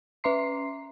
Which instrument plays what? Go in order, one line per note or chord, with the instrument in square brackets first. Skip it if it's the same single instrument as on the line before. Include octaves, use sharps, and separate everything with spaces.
[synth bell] C#4 B4 E5 A#5 C6 C7